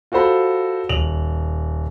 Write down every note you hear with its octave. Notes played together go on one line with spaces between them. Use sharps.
F4 F#4 A4 C5 B5
D#1 F7 F#7